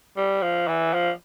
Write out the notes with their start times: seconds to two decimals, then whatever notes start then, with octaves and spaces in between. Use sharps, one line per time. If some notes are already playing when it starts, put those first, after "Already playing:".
0.17 G3
0.42 F3
0.68 E3
0.94 F3